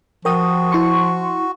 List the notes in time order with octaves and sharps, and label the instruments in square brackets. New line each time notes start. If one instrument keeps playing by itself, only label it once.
[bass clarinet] F3 [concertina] F#4 [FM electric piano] A#4 G5 D#6
[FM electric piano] E4 C6 C#6